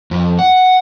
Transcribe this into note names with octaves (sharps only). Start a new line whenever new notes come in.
F2
F#5